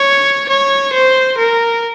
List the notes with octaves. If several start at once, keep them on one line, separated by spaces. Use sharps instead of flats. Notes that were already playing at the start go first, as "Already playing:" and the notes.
Already playing: C#5
C#5
C5
A#4